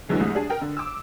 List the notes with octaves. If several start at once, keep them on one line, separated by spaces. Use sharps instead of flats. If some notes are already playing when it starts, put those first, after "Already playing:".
E2 D3 E3 F#3 G#3 D#4
C2 A2 G#3 D#6
D4 G#4 A5
A#4 G5
D3
D6 E6